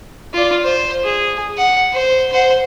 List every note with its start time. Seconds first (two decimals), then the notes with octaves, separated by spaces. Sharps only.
0.34 F4 D5
0.63 C5
1.04 G#4
1.58 F#5
1.93 C5
2.33 C5 F#5